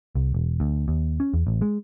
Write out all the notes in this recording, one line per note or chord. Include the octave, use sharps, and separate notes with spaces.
C2
E1
D2
D#2
C#4
E2
A1
G#3